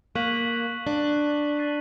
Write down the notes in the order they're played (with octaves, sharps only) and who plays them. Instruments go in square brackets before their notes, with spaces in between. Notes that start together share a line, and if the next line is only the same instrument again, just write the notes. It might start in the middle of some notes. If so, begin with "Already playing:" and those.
[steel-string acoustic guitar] A#3 [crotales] C#6 F#6 B6 D#7 F#7
[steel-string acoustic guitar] D4
[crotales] A6 C7 D#7 F#7